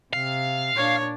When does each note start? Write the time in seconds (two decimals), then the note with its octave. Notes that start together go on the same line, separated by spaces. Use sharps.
0.13 C3 F5
0.76 A#2 D4 C#5